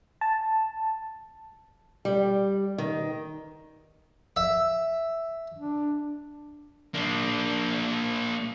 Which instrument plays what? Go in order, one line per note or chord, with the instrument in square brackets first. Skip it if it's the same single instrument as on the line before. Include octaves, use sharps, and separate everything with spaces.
[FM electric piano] A5
[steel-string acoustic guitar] G3
D#3
[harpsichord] E5
[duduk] D4
[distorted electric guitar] A#3 D4